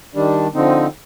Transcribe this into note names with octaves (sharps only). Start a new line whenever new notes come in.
D#3 G3 D4
D3 F3 C4 D#4